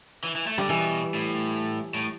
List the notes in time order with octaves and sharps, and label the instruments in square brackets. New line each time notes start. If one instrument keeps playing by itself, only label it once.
[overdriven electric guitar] E3
E3
A3
[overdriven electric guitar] D3 [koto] G3
[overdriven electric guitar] B2 [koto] E3
[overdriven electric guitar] A2
A2